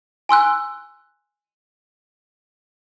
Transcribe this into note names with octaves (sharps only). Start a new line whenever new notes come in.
G#5 C6 E6 F#6